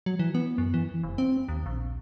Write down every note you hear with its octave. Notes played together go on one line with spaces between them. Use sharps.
F#3
E3
B3
F#2
E3
F1
C4
D#2
A#1